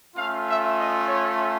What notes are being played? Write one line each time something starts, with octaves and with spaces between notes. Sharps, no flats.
A3 C#4 F4 F5
E5
D#5
C#5